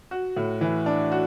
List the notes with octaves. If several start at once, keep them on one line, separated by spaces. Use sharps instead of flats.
F#4
A2
E3
D4
F#4